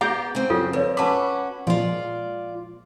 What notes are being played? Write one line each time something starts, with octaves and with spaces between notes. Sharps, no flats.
B3 G#4 F#5 A#5 D6 G6
C#3 C4
F#2 F#3 F4 A4
F2 B4 C#5
C#4 F#4 B4 A5 B5 D6
A#2 F3 G#3 F4 D5